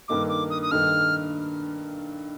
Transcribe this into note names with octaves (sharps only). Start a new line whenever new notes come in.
G2 D#3 A#3 D#4 A4 D6
D6
D#6
D#6
G2 D#3 A#3 D#4 A4 F6